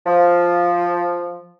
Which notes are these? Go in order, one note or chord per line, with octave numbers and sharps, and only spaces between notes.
F3